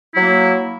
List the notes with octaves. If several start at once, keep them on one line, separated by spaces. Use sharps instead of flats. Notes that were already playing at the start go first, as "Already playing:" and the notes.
F#3 A#3 E4